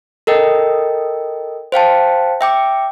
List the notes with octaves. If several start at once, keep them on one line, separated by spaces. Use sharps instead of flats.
A4 A#4 D#5 G5
C5 F5 G5 A5
E5 G5 D6